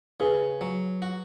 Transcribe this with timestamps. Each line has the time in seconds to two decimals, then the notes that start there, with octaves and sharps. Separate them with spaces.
0.20 C#3 G#4 B4
0.61 F#3
1.02 F#4